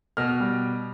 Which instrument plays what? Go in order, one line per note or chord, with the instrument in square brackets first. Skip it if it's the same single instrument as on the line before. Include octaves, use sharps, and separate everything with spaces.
[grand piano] B2 F6
G3